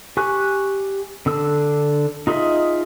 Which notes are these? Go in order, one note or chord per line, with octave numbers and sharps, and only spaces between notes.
G4 G#5 C#6 F#6
D3 D4 E6
D#4 F4 G#4 D#5 E5